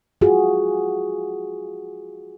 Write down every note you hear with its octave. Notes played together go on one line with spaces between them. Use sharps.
F4 F#4 G#4